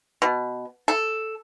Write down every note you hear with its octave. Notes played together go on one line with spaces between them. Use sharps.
B2
A4